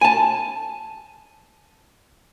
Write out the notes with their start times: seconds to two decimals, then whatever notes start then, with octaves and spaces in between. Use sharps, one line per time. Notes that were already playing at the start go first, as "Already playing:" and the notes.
0.01 G#5 A5